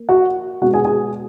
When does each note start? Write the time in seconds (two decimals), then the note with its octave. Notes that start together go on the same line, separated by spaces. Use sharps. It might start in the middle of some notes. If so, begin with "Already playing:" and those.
Already playing: A#3
0.09 F#4 F#5
0.62 B2 G#3 B3 F#4 F#5
0.73 G#4 G#5
0.85 G#4 G#5